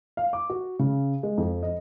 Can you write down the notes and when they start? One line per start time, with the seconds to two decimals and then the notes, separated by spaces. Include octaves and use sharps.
0.17 F5
0.33 D6
0.50 F#4
0.79 C#3
1.23 G#3
1.38 F2
1.63 D#5